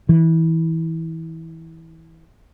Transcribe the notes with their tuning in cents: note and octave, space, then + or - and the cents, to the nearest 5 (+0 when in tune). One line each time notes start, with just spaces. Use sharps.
E3 -25